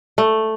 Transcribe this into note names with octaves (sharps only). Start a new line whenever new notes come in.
A3